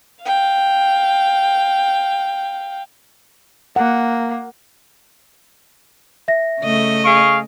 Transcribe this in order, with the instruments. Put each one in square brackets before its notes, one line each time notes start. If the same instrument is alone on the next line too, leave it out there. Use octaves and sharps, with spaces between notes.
[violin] F5 G5
[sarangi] A#3 [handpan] F#5
[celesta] E5 A#6
[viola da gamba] C#3 A3 D#5
[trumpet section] G#4 F5 C#6 [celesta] D7